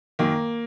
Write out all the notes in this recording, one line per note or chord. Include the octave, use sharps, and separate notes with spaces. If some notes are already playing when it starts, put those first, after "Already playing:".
F#2 D#3 A#3